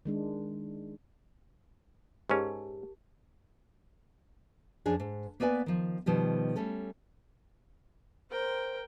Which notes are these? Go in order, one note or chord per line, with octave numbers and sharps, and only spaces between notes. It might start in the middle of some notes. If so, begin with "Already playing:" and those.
D#3 G#3 D4
G#2 C#4 G4 A#4 A5
F2 C#4 D4 G#4
G#2
A#3 B3 B4 D5 G#5
D#3 F3
B2 D#3 F3 G3
G3 A3 C#4 A4
A#4 C5 G5